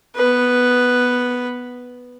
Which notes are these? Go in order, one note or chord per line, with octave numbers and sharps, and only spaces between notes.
B3 B4